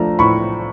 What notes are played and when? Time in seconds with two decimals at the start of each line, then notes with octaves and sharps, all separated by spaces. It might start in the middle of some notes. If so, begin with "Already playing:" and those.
Already playing: F3 A3 D4 A#5
0.19 A2 B5 C#6